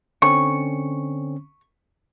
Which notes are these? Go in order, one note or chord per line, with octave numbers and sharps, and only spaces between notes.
D3 C4 C#4 C#6